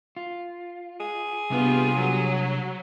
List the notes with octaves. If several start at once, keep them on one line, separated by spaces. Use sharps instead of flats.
F4
G#4
C3 G3 B3 D4 F4 G4
F#3